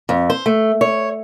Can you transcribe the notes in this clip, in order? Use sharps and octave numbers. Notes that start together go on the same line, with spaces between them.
F2
C5
A3
C#5